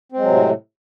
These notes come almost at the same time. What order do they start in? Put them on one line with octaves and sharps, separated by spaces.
C4 G#3 F#3 C3 A2